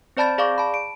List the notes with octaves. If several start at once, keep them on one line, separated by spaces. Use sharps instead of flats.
C4 C5 D5 A5 B5 A6
G#4 D5 F5 C#6 D6
A5 B5
D7